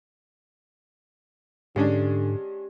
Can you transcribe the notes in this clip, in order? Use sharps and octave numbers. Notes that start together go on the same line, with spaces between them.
G#2 D3 G#3 C#4 D4 G4